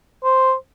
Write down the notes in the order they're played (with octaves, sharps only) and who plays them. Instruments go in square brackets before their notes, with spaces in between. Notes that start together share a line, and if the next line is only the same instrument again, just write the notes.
[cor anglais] C5